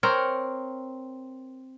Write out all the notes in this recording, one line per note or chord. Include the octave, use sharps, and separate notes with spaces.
C4 A#4 C#5